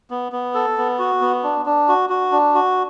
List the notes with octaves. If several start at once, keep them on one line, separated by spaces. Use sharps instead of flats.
B3
B3
A4
B3
F#4
B3
D4
D4
F#4
F#4
D4
F#4